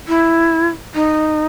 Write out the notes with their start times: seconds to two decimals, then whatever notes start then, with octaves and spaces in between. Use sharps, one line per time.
0.08 E4
0.94 D#4